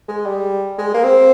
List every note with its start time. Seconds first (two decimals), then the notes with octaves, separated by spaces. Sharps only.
0.08 G#3
0.26 G3
0.78 G#3
0.94 A#3
1.04 C4